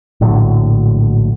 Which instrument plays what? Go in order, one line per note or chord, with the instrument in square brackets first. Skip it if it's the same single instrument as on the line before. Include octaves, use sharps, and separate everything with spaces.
[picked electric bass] A#1 A2 D3 F#3